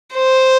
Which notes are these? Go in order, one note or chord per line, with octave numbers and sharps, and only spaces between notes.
C5